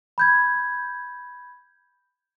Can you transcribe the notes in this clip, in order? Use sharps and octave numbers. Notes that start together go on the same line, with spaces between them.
B5 G6 G#6